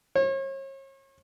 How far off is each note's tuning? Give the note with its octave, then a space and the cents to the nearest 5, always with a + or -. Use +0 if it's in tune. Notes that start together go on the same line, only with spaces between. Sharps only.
C#5 -40